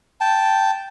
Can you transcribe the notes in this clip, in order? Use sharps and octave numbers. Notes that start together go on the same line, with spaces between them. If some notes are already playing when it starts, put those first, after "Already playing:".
G5 A5